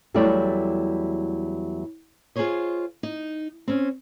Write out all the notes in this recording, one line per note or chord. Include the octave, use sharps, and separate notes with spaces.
E2 F#3 G3 A3 E4 D5
F4 G#4 A4 C5 C#5 D#5
D#4
C4 C#4